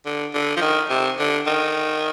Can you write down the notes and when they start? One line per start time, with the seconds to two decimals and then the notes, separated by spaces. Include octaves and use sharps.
0.06 D3
0.34 D3
0.57 F3
0.62 D#3
0.90 C3
1.19 D3
1.47 D#3